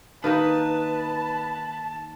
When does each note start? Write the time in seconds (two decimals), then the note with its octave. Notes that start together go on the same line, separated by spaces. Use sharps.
0.24 D#3 A#3 D#4 B4 A5